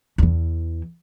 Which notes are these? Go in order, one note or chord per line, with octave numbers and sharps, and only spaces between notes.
E2 E3